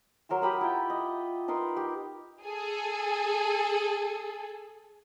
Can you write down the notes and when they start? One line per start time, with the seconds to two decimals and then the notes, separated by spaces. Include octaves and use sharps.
0.29 F#3 A#4 C6 E6
0.42 G4 B5 D#6
0.61 E4 F4 G5
0.90 D#5
1.48 D#4 A#4 B4 C6
1.77 G4
2.42 G#4 A4